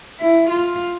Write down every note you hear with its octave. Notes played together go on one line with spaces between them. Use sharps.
E4
F4